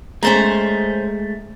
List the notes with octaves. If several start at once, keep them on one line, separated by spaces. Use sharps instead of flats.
G#3 A3 C#4 C5 A#5